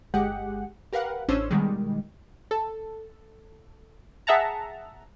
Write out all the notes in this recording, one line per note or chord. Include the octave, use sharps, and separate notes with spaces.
G1 G#3 G4 G#4 F#5
G4 A#4 B4 F5 F#5
A1 C#4 D4 C5 E6
B2 D#3 G3 G#3
A4
G#4 E5 F#5 A5 A#5